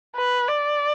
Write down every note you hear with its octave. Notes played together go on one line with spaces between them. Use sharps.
B4
D5